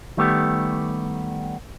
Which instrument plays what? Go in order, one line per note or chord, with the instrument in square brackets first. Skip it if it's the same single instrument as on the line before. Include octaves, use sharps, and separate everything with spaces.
[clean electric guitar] D#3 G3 A3 B3 G4